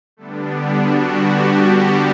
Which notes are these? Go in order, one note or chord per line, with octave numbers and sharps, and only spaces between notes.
D3 G3 A3 B3 D4 A4
F#4
G3 G4